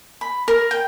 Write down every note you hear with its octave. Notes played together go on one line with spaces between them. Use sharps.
B5
A#4
G5